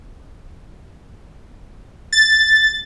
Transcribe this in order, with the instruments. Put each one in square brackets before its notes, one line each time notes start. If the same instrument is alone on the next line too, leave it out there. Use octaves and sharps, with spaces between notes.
[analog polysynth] A6